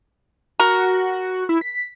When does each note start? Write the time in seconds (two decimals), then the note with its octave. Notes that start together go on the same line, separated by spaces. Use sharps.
0.60 F#4 A#4
1.49 E4
1.61 B6